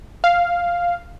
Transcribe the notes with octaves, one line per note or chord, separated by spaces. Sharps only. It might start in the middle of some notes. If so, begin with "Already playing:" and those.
F5